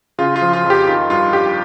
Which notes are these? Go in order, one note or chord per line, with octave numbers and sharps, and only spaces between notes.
C#3 F4
F4
F3
F4
F2
G4
D#3 F4
G2 F4
G2 G4